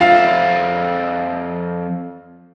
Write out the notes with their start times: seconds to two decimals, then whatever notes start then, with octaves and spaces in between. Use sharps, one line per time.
0.01 F2 F4 D5 E5 F5